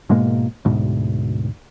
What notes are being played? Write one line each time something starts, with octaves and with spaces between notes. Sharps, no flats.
G#2 B2 G#3 A#3
D2 G#2 B2